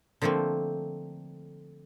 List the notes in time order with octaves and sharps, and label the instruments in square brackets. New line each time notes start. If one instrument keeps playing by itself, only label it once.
[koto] D3 F3 A3 A#3 C4